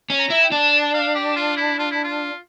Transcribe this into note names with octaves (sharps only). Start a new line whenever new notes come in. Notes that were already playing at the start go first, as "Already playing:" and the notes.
C#4
A#5
E4
G5
D4 A5
A5
F5
G4
F4
E4
F4
E4
F4